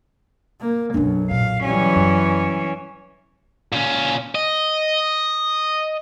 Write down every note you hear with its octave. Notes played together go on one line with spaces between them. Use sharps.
A#3
B1 F#2 C#4 D4
A#2 F5
E3 F#3 G3 C#4
F#2
A#2 C#4
D#5